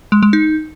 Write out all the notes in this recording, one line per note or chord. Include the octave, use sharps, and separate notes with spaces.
G#3
G#3
D#4